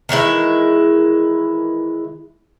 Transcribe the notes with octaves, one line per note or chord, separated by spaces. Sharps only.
D#3 E3 G#3 E4